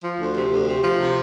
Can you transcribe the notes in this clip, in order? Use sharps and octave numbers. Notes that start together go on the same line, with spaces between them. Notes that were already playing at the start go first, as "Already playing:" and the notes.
F3
D2
C3
D2
C3
F3
C3